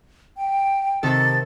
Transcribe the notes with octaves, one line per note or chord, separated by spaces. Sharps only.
G5
C3 D#3 A4 A6